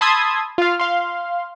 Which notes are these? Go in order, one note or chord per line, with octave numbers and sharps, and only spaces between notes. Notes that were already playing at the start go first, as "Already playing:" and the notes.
A5 B5 C6 D#6 E6 G#6
F4 F5
F5 C6